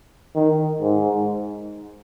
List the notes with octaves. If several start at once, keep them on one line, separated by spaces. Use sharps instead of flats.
D#3
G#2